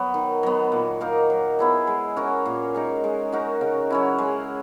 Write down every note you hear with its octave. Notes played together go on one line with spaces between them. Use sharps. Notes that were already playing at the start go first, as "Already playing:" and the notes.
Already playing: F#3 B3
D#3
F#3 B3
A#2
A#3 D#4 A#4
F#3
B3 E4 G#4
G#3
C#4 F#4 A#4
A#2
G#3 D#4 A#4
G#3
D#4 F#4 A#4
C#3
F#3 C#4 E4
G#3